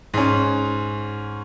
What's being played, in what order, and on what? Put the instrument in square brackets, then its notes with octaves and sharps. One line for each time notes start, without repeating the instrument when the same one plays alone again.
[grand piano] G#2 C#4